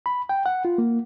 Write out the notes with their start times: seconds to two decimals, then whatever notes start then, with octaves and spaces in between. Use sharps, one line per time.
0.06 B5
0.29 G5
0.46 F#5
0.65 F4
0.78 A#3